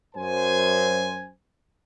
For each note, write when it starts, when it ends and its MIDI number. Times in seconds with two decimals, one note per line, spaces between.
0.15 1.28 42
0.15 1.28 72
0.15 1.28 80